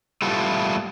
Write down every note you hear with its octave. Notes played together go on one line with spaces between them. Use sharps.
G3 A3 B3 E4 F4